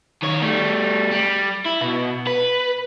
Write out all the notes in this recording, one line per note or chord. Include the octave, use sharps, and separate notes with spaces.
D#3 C#5
G3 A3
G3
E4
B2
B4